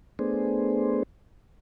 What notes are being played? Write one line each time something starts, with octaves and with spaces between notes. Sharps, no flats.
A3 B3 D4 G#4 C5